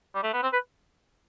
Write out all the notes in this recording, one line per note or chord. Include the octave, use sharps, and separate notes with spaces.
G3
A3
B3
C4
B4